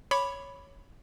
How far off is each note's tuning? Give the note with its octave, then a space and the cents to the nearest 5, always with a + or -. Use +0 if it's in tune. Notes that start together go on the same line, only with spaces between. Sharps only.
C#5 +0 B5 +0 D6 +0